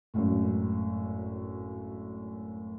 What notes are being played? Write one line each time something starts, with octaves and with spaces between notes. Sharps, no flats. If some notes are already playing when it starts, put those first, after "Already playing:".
G#1 F#2 A2